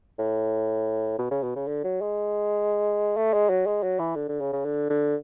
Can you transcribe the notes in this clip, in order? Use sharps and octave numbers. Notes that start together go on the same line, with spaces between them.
A2
B2
C#3
B2
C#3
D3
F#3
G#3
A3
G#3
F#3
G#3
F#3
E3
D3
D3
C#3
C#3
D3
D3